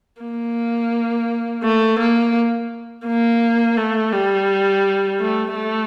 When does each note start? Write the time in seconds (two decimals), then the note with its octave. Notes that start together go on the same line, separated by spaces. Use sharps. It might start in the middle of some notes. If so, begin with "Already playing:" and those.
0.21 A#3
1.63 A3
1.99 A#3
3.06 A#3
3.77 A3
4.13 G3
5.20 A3
5.55 A3